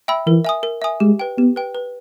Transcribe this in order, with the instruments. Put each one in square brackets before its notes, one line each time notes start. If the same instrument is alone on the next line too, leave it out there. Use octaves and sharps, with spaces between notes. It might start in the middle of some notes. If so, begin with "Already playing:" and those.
[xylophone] E5 G5 B5 E6
[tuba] E3 [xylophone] A#4
[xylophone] E5 G#5 D#6
A#4
E5 G#5 D#6
[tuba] G#3 [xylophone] G4
[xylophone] B4 G5
[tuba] B3 [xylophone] G4
[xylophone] B4 G5
B4